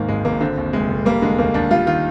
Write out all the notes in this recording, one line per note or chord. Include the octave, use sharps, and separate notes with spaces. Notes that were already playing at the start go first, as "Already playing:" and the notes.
Already playing: D#2 G#2 D#3 A#3
G#1 G#3
G#1 A#3
D3 C4
D#2
F1 G#3
F1
G3 A#3
D3 G#3
D#2 A#3
D#2 D4
G3 F4
D#3 F4